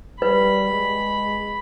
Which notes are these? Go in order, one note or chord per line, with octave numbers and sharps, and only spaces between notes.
G3 B4 B5
G#3